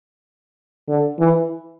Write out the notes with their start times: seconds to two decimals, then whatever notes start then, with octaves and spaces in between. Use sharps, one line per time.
0.88 D3
1.19 E3